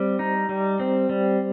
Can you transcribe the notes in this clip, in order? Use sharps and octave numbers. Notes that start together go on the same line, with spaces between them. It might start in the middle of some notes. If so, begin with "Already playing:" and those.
Already playing: G3 C4
D#4
G3
C4
G3